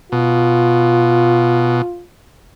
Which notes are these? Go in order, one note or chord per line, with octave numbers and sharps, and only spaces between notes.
B2 F4